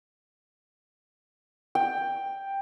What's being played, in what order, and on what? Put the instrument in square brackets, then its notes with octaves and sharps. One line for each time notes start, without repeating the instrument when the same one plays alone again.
[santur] G5